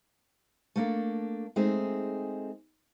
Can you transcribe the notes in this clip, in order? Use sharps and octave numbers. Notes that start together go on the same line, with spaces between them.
A3 A#3 D4
G#3 A3 C4 D#4 G#4